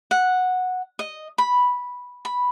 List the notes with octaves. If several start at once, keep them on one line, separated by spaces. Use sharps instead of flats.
F#5
D#5
B5
B5